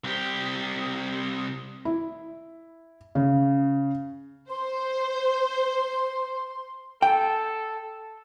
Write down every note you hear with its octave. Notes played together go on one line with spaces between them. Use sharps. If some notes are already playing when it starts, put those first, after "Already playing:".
C2 G4
E4
C#3
C5 C6
A4 G5